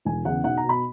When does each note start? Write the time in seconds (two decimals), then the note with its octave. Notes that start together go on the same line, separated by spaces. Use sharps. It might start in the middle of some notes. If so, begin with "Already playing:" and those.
0.05 E1 G#5
0.25 E2 C#3 F#5
0.44 B1 F#5
0.57 A#5
0.64 B2
0.69 B5